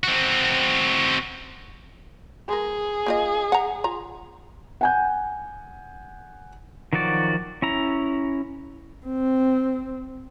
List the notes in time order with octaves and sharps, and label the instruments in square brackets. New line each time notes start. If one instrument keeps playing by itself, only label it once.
[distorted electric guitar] C4 F#4
[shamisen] G#3 A#4 [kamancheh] G#4
[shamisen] A#3 F4 D#5
F#5 A#5
F4 A#5
[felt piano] F#5 G#5 G6
[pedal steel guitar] D#3 F3 F#3 F#4 D5
C#4 E4 A#5
[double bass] C4